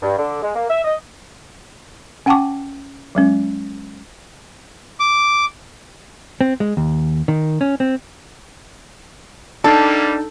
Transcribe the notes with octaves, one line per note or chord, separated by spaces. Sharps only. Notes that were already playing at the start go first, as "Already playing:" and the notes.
G2
D3
G#3
A#3
E5
D#5
C#4 F#5 G5 A5 C#6 D6
F#3 G#3 C#4
D6
C4
G#3
D#2
D#3
C#4
C4
G3 A#3 D4 D#4 A4 A5